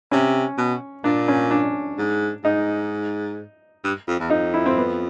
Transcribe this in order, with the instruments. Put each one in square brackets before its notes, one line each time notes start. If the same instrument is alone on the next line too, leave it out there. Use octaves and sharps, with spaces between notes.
[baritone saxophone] C3 [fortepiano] C#4
[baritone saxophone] B2
[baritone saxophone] A#2 [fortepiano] D4
[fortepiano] C#4
D4
[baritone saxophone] G#2
[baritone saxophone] G#2 [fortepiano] D#4
[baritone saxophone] G2
F2
E2
[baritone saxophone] F2 [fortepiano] D#4
[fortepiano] E4
C4
B3